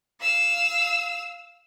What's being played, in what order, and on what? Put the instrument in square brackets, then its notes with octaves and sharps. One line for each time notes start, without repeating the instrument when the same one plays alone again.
[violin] F5 E6